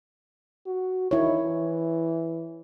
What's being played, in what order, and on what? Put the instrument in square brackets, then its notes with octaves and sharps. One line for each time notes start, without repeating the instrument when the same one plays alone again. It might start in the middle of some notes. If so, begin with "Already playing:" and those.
[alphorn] F#4
[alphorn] D#3 [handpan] E4 C#5
[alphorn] E3